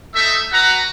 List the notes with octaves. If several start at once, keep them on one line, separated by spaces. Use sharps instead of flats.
A3 D#4 E5
F#4 B4 F#5 A#5